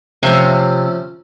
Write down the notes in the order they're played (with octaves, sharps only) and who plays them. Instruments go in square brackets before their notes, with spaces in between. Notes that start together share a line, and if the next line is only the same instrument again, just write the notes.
[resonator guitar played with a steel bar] C3 [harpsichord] F3 A3 C#4